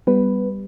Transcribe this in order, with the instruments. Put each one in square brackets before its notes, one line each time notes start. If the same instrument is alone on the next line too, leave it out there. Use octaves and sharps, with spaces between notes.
[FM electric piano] G3 B3 B4